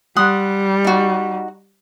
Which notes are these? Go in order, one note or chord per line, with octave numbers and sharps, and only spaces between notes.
G3 F#5 C6 D#6
D#4 F#4